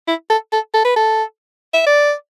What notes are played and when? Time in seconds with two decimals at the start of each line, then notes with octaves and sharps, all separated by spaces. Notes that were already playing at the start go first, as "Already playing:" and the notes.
0.08 E4
0.30 A4
0.52 A4
0.74 A4
0.85 B4
0.96 A4
1.74 E5
1.87 D5